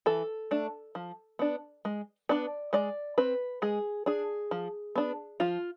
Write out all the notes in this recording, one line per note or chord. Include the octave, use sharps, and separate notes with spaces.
E3 A4
A3 D4
F3
B3 D4
G#3
B3 D4 D5
G#3 D5
C4 B4
G#3 G#4
D4 G#4
F3
B3 D4
F3 F4